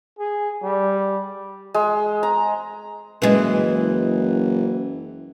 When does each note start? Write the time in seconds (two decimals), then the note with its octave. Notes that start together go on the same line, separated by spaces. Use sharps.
0.19 G#4
0.63 G3
1.74 G#3
2.23 A#5
3.22 F#1 E3 G#3